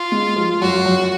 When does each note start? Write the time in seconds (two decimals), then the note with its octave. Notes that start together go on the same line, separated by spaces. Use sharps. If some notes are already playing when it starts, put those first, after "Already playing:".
Already playing: F4
0.12 G#3
0.36 F3
0.61 F#2 F#4
0.86 F#2